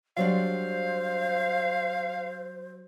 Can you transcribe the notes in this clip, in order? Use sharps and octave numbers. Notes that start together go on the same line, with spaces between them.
F#3 G3 D4 C5 F5